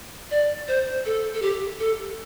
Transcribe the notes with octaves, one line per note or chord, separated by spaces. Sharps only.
D5
C5
A4
A4
G4
A4